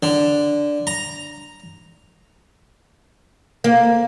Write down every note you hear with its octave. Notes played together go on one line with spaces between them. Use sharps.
D3
A#5
A#3